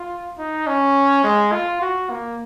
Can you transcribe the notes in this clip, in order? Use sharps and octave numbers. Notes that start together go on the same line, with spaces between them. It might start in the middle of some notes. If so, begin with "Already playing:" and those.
Already playing: F4
D#4
C#4
G#3
F4
F#4
A#3